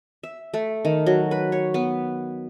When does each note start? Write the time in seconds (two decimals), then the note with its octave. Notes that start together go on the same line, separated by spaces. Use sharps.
0.23 E5
0.54 A3
0.85 D#3
1.06 F#3
1.31 B4
1.52 C#5
1.74 B3